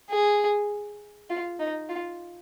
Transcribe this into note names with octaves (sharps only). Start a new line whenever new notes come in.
G#4
F4
D#4
F4